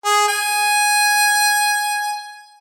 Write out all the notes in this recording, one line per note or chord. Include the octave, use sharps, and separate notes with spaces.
G#4
G#5